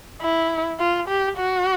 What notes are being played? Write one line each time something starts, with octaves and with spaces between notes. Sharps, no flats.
E4
F4
G4
F#4